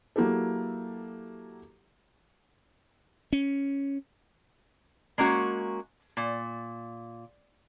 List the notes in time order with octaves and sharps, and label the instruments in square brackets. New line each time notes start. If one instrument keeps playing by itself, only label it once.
[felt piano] F#3 A#3 E4 G4 A4
[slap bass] C#4
[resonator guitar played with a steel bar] G#3 A#3 C#4 F#4
A#2